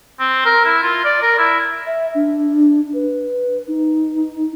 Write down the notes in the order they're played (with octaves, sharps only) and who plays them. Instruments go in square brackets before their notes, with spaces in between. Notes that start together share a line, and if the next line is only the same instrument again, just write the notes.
[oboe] C4
A#4
E4
F4
D5
A#4
E4
[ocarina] E5
D4
B4
D#4